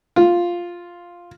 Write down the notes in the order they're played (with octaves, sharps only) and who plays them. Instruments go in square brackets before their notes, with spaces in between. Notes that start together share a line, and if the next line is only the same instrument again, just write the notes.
[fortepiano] F4